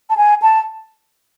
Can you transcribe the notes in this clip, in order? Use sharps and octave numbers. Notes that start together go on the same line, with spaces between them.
A5
G#5
A5